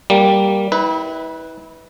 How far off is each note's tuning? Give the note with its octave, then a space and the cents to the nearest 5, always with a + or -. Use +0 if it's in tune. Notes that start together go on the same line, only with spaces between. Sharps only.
G3 +0 A#3 +0
E4 -35 B4 +0